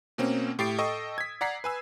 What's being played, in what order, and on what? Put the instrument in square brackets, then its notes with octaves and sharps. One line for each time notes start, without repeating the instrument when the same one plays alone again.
[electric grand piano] B2 A#3 C4 C#4
A2 G4 A6 C7 D7
A4 D#5 G5 C#6 D#6 E6
G#6 B6
D5 F#5 A#5 B6 C7
B4 G#5 E6